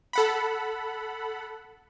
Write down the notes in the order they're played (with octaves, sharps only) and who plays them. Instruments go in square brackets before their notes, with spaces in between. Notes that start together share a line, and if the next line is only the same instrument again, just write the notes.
[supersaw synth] A4 F#5 B5